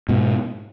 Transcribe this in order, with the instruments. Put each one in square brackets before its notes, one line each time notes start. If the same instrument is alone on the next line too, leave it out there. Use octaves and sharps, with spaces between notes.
[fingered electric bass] G#2 B2